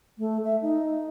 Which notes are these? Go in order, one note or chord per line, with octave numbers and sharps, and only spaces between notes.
A3
E5
D#4